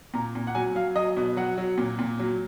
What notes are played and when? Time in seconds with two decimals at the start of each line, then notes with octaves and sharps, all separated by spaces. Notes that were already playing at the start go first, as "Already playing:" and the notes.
0.14 A#2 A#5
0.35 A#2
0.47 F#5
0.55 F#3 G#5
0.75 F#3 F5
0.96 F#3 D#5
1.17 B2
1.37 F#3 F#5
1.58 F#3
1.78 A#2
1.99 A#2
2.19 F#3